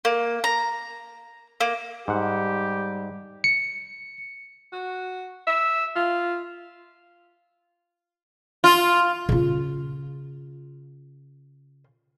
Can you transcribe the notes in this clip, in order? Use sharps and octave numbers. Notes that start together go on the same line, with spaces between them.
A#3
A#5
A#3
G#2 G3 G4 F#5
C#7
F#4
E5
F4
F4
C#3 F4